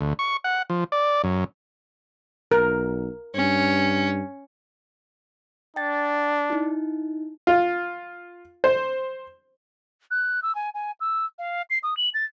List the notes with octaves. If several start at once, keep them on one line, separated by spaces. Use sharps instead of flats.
D2
C#6
F#5
F3
D5
F#2
B1 A#4
G2 C#4
D4 G5 A6
D#4 E4
F4
C5
F#6
E6
G#5
G#5
E6
F5
C7
D#6
F#7
A6